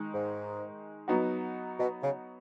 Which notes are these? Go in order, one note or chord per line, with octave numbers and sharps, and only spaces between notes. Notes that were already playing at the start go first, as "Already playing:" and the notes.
Already playing: D#3 G#3 D#4
G#2
F#3 B3 D#4 F#4
B2
C#3